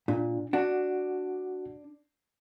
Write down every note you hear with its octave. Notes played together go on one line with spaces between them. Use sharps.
A#2 D4
D4 F#4 F#5